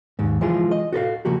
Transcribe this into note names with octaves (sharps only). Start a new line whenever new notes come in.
D#2 G#2
E3 F3 G#3 F4 G#4
D#5
F#4 A4 B4 F5
C#3 F3 A#3 F#4 G4